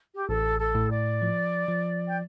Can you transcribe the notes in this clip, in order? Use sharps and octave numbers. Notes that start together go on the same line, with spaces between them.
G4
A1 A4
A4
A2
D5
F3
F3
G5